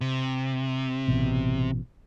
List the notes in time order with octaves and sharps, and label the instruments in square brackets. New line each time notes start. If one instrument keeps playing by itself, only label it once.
[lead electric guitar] C3
[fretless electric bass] A1 B2